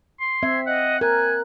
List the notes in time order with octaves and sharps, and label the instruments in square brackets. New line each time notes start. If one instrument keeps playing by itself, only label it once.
[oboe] C6
[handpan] C4 E5 [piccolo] G#6
[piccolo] D#5 [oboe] F#5
[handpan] A#4 [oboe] G#5 [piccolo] F#6